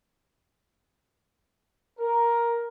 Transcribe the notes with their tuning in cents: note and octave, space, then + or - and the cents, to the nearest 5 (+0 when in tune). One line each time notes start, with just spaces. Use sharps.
A#4 +10